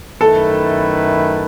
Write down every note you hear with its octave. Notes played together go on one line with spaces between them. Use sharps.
F#2 D#3 A3 E4 A4 B4